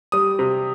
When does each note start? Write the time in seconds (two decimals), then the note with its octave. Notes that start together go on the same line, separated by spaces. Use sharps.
0.12 G3 D#6
0.39 C3